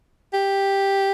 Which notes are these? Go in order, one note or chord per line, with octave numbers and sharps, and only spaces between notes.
G4